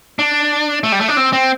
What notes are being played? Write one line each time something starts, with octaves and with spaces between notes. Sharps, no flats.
D4
A3
G3
A3
D4
C4
C4